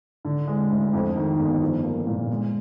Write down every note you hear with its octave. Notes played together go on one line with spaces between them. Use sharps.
D3
G#3
D2
F2
D#3
G1
F3
A#3
A#2
G#3